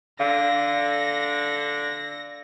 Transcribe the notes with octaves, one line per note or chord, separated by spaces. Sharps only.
D3 F5 A#6